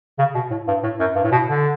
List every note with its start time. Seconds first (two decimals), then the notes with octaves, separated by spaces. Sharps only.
0.19 C#3
0.35 B2
0.51 A2
0.68 G2
0.83 A2
1.00 F#2
1.15 G2
1.24 A2
1.32 B2
1.48 D3